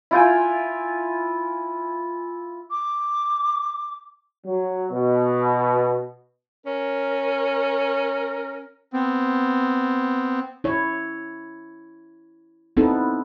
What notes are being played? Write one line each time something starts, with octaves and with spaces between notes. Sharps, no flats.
E4 F4 G5 G#5
D6
F#3
B2
C#4 A#4
B3 C4
E4 C#5
B3 C4 D#4 E4 A4